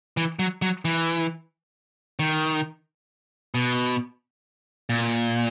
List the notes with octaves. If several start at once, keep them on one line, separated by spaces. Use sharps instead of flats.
E3
F#3
F#3
E3
D#3
B2
A#2